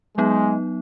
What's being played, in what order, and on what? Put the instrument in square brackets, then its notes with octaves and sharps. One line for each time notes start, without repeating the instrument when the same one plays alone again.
[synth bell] F#3 B3 D#4 [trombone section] G#3